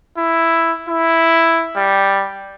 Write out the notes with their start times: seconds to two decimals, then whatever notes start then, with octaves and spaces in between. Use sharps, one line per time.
0.17 E4
0.88 E4
1.76 G3